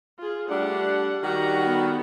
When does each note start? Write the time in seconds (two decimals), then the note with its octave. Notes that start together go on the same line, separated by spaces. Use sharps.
0.19 F4 G#4
0.50 G3 A3 D4 F#5
1.23 D#3 G3 F#4 G4 A#5
1.65 B3 A4